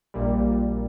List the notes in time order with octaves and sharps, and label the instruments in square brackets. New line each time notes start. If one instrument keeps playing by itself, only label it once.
[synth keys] A#1 A#2 G3